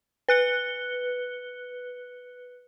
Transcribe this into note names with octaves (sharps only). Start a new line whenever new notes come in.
B4 F#6 C#7 G7